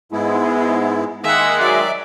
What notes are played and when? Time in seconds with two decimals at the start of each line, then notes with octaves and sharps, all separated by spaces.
0.12 G#2 G#3 B3 E4
1.24 D#3 G#3 A#3 E5 F#5
1.60 F#3 D5 E5